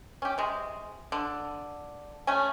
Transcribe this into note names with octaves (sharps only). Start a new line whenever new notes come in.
C#4 G4
C3 G#3
D3
A3 C#4 G#5